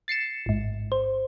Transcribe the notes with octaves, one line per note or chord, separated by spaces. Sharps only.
A6 C7 C#7 E7
A1 G#2
C5